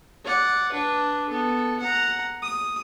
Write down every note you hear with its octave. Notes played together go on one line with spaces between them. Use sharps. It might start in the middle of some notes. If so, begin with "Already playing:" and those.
D5 F#5
D4 B4
B3 A4
F#5 A#5
D#6